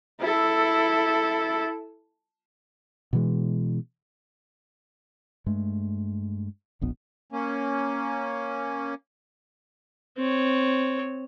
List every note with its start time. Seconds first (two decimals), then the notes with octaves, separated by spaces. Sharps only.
0.20 E4 A4
3.13 B2 E3 G#3
5.46 G2 G#3 A3
6.81 E1 A#1 B3
7.32 A#3 C#4
10.17 C4 C#5